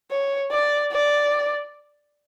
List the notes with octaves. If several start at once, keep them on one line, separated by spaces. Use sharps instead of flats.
C#5
D5
D5